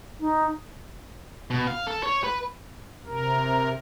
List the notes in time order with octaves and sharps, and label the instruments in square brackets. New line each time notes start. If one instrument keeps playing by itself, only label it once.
[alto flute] D#4
[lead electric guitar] B2
F5
A4
C#5
B4
[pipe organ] C3 A#4